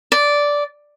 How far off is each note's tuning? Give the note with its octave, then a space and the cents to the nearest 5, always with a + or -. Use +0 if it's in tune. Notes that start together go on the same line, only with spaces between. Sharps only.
D5 -10